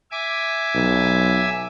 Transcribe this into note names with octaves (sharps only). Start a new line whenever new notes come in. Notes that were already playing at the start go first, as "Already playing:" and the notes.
E5 G#5 D6
B1